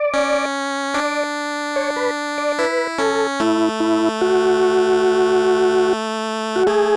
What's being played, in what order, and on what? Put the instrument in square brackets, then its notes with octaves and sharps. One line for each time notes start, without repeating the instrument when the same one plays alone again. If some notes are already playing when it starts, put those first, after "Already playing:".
Already playing: [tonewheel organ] D5
[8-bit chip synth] C#4
[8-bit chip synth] D4 [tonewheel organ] D5
[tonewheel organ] C#5
B4
D5
[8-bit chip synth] E4 [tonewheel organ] B4
[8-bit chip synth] C#4 [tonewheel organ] A4
[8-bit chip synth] A3 [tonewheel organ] E4
[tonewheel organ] E4
F#4
F#4
[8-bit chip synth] A3 [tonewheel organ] G#4